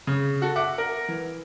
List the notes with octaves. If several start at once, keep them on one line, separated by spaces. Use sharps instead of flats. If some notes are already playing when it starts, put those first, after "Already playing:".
C#3
F#4 A4
E5 F#5 D6
A#4
E3